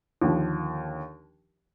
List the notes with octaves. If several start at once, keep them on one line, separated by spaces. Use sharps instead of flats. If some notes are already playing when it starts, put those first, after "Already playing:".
D#2 D3 F3